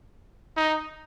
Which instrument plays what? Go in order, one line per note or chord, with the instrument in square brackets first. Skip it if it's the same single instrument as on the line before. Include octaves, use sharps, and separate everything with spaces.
[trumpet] D#4